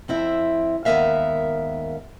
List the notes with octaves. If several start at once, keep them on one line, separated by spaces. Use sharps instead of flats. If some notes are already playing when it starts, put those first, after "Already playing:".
F2 C4 E4 E5
D#2 G#2 B3 A#4 E5 F5